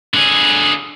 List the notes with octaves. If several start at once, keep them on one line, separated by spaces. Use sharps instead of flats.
D3 G#4